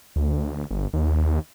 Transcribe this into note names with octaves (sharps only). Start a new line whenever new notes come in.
D2
G1
D#2